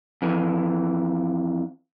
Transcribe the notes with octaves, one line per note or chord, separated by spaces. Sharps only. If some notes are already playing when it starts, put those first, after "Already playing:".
F2 E3